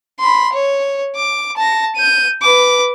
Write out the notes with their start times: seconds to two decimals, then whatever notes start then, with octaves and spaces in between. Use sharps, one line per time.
0.19 B5 C6
0.53 C#5
1.16 D6
1.57 A5 A#6
1.95 G6 D#7
2.42 B4 D6